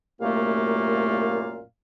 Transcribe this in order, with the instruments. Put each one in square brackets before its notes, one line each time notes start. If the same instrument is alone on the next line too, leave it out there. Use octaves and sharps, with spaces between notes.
[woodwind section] C2 F#2 A#2 A3 A#3 F5